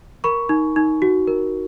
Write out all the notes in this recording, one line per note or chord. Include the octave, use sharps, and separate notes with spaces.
A#4 B5 C#6
D#4
D#4
F#4
A#4